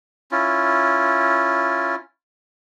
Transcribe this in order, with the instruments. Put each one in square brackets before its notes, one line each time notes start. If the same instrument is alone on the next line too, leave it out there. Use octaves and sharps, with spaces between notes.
[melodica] C#4 E4 F4